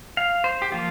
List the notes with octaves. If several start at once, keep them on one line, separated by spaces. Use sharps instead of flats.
F5
C5
G4
F3 A#3 F4